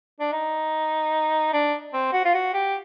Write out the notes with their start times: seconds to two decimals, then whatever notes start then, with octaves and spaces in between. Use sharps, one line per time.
0.20 D4
0.32 D#4
1.54 D4
1.94 C4
2.13 F#4
2.25 F4
2.34 F#4
2.54 G4